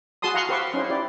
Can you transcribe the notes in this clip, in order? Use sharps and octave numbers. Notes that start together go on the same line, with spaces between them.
F#4 G#4 A5 C6 D#6
F5 F#5 A#5 C6 C#6
G4 B4 C5 E5 F5 C#6
C#4 D#4 E4 C5
E4 G4 D5